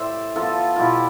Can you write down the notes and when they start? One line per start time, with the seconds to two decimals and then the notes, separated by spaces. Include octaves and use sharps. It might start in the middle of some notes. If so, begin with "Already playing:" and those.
Already playing: A2 G4 C5 D5 E5
0.36 F3 B3 F4 A4
0.76 B2 E4 F4 G4